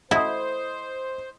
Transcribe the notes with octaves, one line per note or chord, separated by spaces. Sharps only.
A3 E4 F#4 A4 C5 D#5 D#6